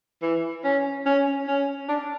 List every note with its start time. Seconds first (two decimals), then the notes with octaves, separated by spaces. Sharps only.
0.22 E3
0.64 C#4
1.06 C#4
1.47 C#4
1.88 D4